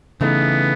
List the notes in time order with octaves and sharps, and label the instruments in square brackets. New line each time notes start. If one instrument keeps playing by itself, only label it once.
[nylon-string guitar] C#3 E3 A3 D#4 [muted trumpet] B3